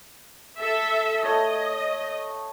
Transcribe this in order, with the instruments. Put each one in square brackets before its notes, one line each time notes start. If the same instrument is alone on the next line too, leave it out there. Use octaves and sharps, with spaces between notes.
[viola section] A4 E5
[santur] A3 C#5 A5 [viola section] D#5